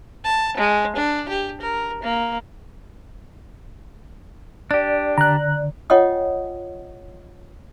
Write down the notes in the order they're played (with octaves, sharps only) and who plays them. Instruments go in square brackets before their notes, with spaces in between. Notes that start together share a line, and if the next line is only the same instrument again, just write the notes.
[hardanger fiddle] A5
G#3
D4
G4
A#4
A#3
[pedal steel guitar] D4 G4 [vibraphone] D5
[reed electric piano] D3 [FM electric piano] A#5 F#6
[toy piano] F4 C#5 D#5 F#5 G5 D#6